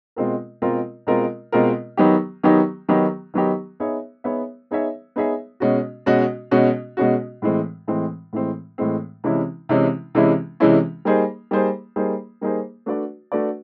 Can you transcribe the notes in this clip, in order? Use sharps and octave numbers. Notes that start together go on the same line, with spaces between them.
B2 G#3 C4 F4 A#4
B2 G#3 C4 F4 A#4
B2 G#3 C4 F4 A#4
B2 G#3 C4 F4 A#4
D#3 F#3 B3 D#4 G4
D#3 F#3 B3 D#4 G4
D#3 F#3 B3 D#4 G4
D#3 F#3 B3 D#4 G4
B3 D#4 G#4 C#5 E5
B3 D#4 G#4 C#5 E5
B3 D#4 G#4 C#5 E5
B3 D#4 G#4 C#5 E5
B2 G#3 C#4 F#4
B2 G#3 C#4 F#4
B2 G#3 C#4 F#4
B2 G#3 C#4 F#4
A2 E3 G#3 C4
A2 E3 G#3 C4
A2 E3 G#3 C4
A2 E3 G#3 C4
C3 E3 G#3 C#4 E4
C3 E3 G#3 C#4 E4
C3 E3 G#3 C#4 E4
C3 E3 G#3 C#4 E4
G3 A#3 D#4 G#4 C5
G3 A#3 D#4 G#4 C5
G3 A#3 D#4 G#4 C5
G3 A#3 D#4 G#4 C5
A3 D4 F#4 B4 D5
A3 D4 F#4 B4 D5